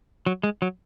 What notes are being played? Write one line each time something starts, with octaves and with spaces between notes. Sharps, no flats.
F#3
G#3
F#3